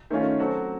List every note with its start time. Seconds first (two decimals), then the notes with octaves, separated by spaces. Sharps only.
0.10 D#3 A3 C#4 F4
0.39 F#3 C4 F#4 A4